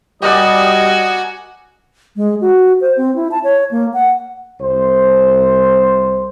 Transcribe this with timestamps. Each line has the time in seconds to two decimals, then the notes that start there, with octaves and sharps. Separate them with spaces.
0.22 G3 F#4 G4 A#4 D5 D#5 G#5
2.16 G#3
2.41 F#4
2.81 C5
2.97 C4
3.16 E4
3.31 A5
3.44 C#5
3.71 A#3
3.94 F#5
4.61 C2 C5